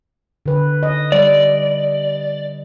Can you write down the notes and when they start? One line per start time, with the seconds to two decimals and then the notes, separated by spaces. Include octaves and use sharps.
0.46 D3 B4
0.83 D#5
1.12 G3 D5